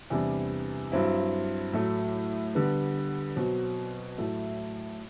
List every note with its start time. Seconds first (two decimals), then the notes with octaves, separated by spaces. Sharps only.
0.10 E2 C3 G3 D4
0.92 G2 F#3 C4 E4
1.73 A2 F#3 A3
2.55 D3 G3 B3
3.36 B2 F#3 C4
4.18 A2 F#3 A3 E4